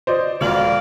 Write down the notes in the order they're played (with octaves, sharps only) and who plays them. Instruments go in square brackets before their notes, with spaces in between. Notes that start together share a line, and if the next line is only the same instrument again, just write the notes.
[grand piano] C5 D5 D#5
[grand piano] E1 B2 F#7 [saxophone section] F2 D5 F5